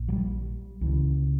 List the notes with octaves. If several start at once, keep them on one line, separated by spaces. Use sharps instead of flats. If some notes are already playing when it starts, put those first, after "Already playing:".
Already playing: A#1 A#2
F#3
G3
C#2 C#3 E3